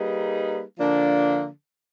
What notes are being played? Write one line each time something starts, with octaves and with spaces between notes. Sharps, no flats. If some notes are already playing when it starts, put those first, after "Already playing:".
Already playing: G3 A#3 D#4 G#4 B4
D3 F3 A#3 D4